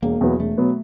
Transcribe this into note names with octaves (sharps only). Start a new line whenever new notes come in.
E1 A#3
E2 B2 F#3 B3
E1 A3
B2 F#3 B3